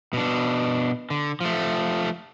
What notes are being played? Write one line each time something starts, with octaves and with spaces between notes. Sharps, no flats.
B2 D4
D3
F3 A3